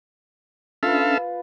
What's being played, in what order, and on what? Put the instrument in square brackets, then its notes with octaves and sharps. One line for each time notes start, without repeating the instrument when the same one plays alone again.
[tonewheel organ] C#4 D4 [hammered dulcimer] F4 B4 [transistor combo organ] A4 E5 F5